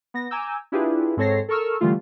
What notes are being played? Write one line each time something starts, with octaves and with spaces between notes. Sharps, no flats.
B3 A#6
G#5 A#5 D6 E6 G6
D4 E4 F4 G4 G#4 B4
G#2 C4 A4 C#5 A#6 C7
A4 A#4 C#6 E6 F6
D3 E3 G3 A3 F4